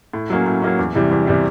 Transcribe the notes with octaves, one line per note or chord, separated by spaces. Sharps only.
A2
F#3 A#3 C#4
A2
F#3 A#3 C#4
E2
C3 E3 G3
E2
C3 E3 G3